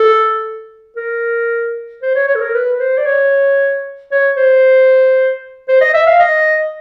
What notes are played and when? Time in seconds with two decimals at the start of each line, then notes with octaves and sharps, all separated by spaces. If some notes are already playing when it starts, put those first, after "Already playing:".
Already playing: A4
0.97 A#4
2.02 C5
2.15 C#5
2.27 C#5
2.35 A4
2.41 A#4
2.54 B4
2.80 C5
2.98 D5
3.06 C#5
4.12 C#5
4.37 C5
5.69 C5
5.81 D#5
5.94 E5
6.07 F5
6.20 D#5